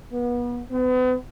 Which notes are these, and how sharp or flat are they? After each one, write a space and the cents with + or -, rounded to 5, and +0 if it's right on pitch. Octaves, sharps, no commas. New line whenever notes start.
B3 -30
B3 +40